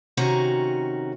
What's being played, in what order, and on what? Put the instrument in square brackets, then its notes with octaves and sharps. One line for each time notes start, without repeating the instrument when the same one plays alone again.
[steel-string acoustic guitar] C3 D#3 C#4 F#4 A#5